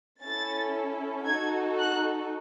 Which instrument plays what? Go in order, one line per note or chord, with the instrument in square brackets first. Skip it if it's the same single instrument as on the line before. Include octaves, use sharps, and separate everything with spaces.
[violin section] C#4 E4 A4 A6
D#4 F#4 A4 G#6
F#6